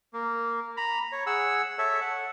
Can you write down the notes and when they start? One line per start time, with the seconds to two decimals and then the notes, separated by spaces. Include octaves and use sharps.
0.13 A#3
0.77 A#5 B5
1.12 C#5
1.27 G#4 F#5 E6
1.78 A4 C#5 E5
2.01 F#5